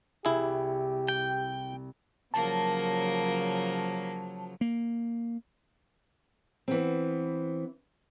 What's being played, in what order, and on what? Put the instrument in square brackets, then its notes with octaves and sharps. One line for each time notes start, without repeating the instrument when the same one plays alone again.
[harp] C2 [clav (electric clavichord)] E4 G#4 [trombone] G4
[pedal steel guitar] G5
[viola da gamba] C#3 F3 F#3 [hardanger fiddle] A#3 A#4 [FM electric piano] A5
[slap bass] A#3
[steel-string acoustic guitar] E3 B3 C4